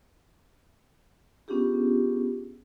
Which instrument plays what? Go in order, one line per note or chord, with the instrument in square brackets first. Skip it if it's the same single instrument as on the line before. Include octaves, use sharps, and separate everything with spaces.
[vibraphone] B3 C#4 D4 F4 G4 G#4